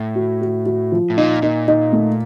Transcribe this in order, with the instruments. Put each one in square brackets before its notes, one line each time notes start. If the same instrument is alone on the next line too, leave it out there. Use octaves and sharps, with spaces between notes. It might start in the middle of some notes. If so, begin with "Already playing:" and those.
Already playing: [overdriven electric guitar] A2
[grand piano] F#4
F#4
F#4
F3
[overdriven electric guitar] A2
[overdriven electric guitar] A#2 [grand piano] D#4
[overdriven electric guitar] A#2 [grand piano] D#4
[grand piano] D#4
A3